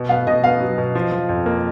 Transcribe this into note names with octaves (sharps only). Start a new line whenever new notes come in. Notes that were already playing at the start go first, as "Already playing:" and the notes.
Already playing: B2
B3 F5
B2 D#5
B3 F5
F#3
B2
F3
F3
F2
A#3